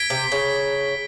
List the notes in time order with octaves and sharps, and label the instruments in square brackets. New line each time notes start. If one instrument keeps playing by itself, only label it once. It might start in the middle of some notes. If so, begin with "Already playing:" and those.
Already playing: [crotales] G#6 B6 D7 G7
[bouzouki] C3
C#3